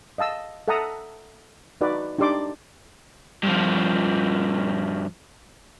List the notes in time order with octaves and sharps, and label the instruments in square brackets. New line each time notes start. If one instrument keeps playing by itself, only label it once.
[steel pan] D#5 F5 A5 E6
A4 E5 F#5 A5 A#5 D#6
D#4 F#4 B4 D5
D4 D#4 G4 D5 C6 D6
[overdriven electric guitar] G2 F3